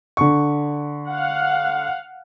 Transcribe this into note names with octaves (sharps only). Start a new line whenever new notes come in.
D3 C#6
F5 F#5